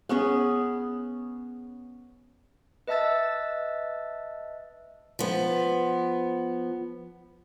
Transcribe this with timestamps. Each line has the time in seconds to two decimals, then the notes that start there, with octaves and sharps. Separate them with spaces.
0.09 B3 C#4 G#4
2.87 B4 D#5 E5 A5 E6 A6
5.19 F3 B3